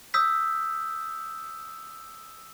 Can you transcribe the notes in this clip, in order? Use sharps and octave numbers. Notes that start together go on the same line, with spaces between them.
D#6 E6 G6 B6